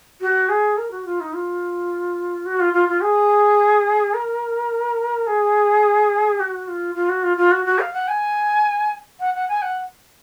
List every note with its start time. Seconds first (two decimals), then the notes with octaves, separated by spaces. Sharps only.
0.21 F#4
0.49 G#4
0.77 A#4
0.91 F#4
1.06 F4
1.20 D#4
1.34 F4
2.46 F#4
2.60 F4
2.74 F4
2.89 F4
3.02 G#4
4.14 A#4
5.27 G#4
6.40 F#4
6.68 F4
6.95 F4
7.09 F#4
7.23 F4
7.37 F4
7.51 F#4
7.66 F#4
7.80 F5
7.93 F#5
8.08 G#5
9.20 F#5
9.34 F#5
9.48 G#5
9.62 F#5